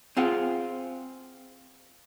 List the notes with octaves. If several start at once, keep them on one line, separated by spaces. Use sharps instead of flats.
C4 F4 G#4 F#5